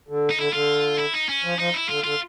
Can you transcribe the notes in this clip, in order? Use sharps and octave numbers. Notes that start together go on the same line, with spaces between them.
D3
D#4
D3 E4
D3 F4
E4
D#4
C#4
F3
F3 D#4
E4
D3 F4
D3 F4